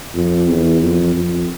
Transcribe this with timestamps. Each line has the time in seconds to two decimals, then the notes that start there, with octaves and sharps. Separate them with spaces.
0.14 F2
0.48 E2
0.81 F2
1.15 F2